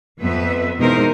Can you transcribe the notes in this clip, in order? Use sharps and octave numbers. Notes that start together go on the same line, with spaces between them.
F2 B3 B4 E5
E2 B2 G#3 D#4 A#4 C5